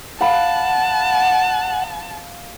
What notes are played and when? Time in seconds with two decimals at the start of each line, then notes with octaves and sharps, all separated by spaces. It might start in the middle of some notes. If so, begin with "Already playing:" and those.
0.21 F5 F#5 A5 B5